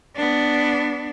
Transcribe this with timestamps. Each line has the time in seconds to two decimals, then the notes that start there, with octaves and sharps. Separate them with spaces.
0.16 B3 D4